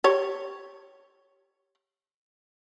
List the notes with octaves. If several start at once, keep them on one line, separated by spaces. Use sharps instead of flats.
G4 C#5